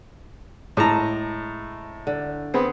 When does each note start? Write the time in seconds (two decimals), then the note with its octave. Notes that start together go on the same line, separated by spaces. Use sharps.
0.77 A2 G#3 A5 A#5
2.07 D3
2.54 B3 C4 G#4